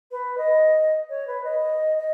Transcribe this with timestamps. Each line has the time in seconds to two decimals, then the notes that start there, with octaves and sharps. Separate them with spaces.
0.11 B4
0.38 D#5
1.09 C#5
1.27 B4
1.44 D#5
1.98 D#5